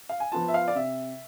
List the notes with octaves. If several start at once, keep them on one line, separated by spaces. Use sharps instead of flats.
F5
G#5
F3 B3 F4 A5
E5
F5
D5
C3 E5